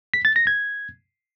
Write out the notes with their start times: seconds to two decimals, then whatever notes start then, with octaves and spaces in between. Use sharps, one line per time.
0.14 B6
0.25 A6
0.36 A#6
0.47 G#6